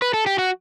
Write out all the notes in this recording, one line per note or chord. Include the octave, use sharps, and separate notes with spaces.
B4
A4
G4
F#4